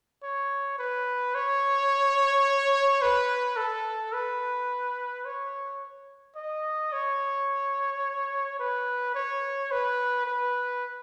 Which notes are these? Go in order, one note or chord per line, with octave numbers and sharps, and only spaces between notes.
C#5
B4
C#5
B4
A4
B4
C#5
D#5
C#5
B4
C#5
B4
B4